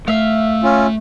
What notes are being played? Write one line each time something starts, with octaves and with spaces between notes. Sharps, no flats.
A3 E5 F5
C#4 F4